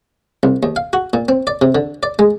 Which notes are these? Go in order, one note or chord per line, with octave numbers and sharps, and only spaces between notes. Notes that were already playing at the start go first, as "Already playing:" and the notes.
C2
D#2
F5
F#4
A#2
C4
D5
C3
D3
D5
G#3